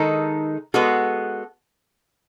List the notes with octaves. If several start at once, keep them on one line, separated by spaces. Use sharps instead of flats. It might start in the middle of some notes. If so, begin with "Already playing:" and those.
Already playing: D#3 G#3 D#4 A4
G#3 B3 F#4 A4